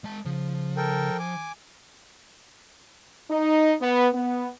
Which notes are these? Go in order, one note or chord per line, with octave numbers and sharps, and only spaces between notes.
G#3 A5
C#3 F3
A4 A#4 G5
G#5 D6
D#4
B3
B3